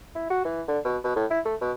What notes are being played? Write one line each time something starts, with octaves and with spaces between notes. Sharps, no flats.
E4
F#4
E3
D3
B2
B2
A2
E4
A3
B2